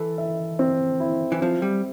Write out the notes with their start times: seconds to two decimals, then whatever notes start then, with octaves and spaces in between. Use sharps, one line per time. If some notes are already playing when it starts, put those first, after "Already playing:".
Already playing: E3 A4
0.18 E5
0.59 C4
1.00 E4
1.32 E3
1.41 F3 C4
1.62 G3